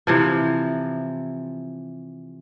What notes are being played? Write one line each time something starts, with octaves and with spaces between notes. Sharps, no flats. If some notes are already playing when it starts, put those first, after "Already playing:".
C3 E3 F3